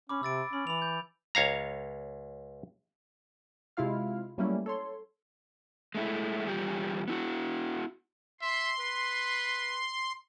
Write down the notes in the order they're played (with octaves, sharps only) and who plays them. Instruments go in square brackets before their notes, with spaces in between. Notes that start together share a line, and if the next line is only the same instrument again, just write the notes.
[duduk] C#4 [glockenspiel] B5 D6
[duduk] C3 [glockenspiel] E6 A6 D7
[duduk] C#4 [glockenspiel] B5
[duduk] E3 [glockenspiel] B5 F7
[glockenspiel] G6
[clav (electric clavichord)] C#2 C#5 F5 A#5
[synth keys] C3 G#3 E4 F4 F5 F6
F#3 G3 A3 A#3 C#4 E4
A4 C#5 C6
[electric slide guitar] G#3 A3 D#4 E4
E2 G3 F4 G4
B3 E4 F#4
[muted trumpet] E5 [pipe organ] C6
[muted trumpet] B4